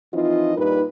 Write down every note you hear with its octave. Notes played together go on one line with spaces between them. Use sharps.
E3 F3 C4 D#4 F4 D#5
G2 A#2 G3 D#4 A#4 B4